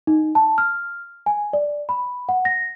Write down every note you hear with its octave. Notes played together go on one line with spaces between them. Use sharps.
D#4
A5
F6
G#5
D5
B5
F#5
A#6